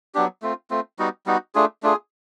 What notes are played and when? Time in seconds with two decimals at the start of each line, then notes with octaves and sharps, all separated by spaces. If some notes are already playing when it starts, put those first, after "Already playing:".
0.15 F#3 B3 D4 G4
0.42 A3 C4 F4
0.70 A3 C4 F4
0.99 G3 B3 D#4 F#4
1.26 G3 B3 D#4 F#4
1.55 A3 D4 F4 G#4
1.83 A3 D4 F4 G#4